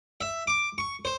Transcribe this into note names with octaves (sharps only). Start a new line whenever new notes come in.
E5
D6
C#6
C5